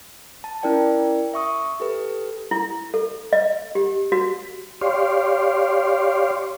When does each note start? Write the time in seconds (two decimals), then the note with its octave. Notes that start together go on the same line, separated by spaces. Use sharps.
0.44 A5
0.63 C#4 E4 A#4 D5 G5
1.34 E5 C#6 D#6
1.80 G4 A4 B4
2.51 E4
2.94 A4
3.33 D#5
3.75 G4
4.12 F#4
4.81 G4 C#5 D5 F5 C6